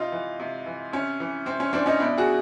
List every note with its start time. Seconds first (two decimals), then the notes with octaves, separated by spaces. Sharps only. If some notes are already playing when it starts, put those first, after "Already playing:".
Already playing: C3 D#4 F4
0.12 E3
0.40 C3
0.66 E3
0.93 C3 C#4
1.20 E3
1.46 C3 C4
1.60 C#4
1.73 E3 C4 D4
1.86 C#4 D#4
2.00 B2 D4 E4
2.18 F#4 G#4